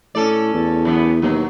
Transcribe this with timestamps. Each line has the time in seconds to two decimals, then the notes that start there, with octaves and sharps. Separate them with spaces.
0.15 A2 C#4 A4 D5
0.54 E2
0.85 F#2 E3 B3
1.22 D#2 B2 F#3